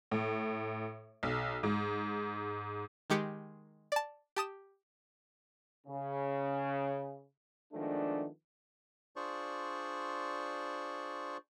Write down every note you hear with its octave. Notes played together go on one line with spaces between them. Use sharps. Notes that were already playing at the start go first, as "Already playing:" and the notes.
A2
B1
G#2
D#3 G#3 G4 C#7
D5 A5
G4 A5 D#6 E7
C#3
D#3 F3 G#3 A3 B3 D4
D4 F4 G#4 C5 D5 C#6